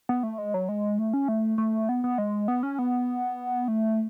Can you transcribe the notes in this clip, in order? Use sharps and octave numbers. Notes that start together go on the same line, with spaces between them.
B3
A3
G#3
F#3
G#3
A3
C#4
A3
A3
B3
B3
G#3
B3
C#4
B3
A3